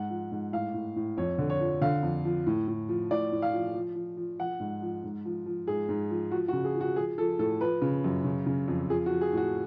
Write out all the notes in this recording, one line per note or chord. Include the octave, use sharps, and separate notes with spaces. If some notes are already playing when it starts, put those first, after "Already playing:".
Already playing: G#2 F#5
F3
G#2
A2 F5
A2
A2
F2 C#5
D3
C#5
F3
D3 F5
F2
F3
A2
A2
F3
A2 D5
A2
F5
F3
F3
F3
F3
F3 F#5
G#2
F3
G#2
F3
F3
G#2 G#4
G#2
F3
F3 F#4
F#4
C#3
G#4
F3
F#4
F3 G#4
F3 A4
A2 A4
F3 B4
C#3
F#2
C#3
C#3
F2
F3 G#4
F#4
F3
G#4
A2 F#4